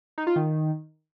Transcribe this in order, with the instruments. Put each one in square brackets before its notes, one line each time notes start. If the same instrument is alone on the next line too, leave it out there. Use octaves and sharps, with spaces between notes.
[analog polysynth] D#4
F4
D#3